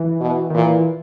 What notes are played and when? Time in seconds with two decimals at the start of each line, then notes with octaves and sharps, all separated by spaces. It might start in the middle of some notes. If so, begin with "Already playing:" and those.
Already playing: E3
0.21 B2
0.50 D#3
0.55 A#2 E3